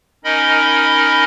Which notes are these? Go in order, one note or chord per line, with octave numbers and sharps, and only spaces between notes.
C#4 D#4 A#4 D#5 B5